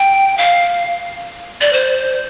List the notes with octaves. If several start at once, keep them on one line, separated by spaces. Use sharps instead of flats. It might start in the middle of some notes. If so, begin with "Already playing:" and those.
Already playing: G5
F5
D5
C5